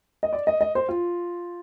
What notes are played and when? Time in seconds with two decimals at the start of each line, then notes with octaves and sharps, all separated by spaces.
0.23 D#5
0.33 D5
0.47 D#5
0.61 D#5
0.75 C5
0.89 F4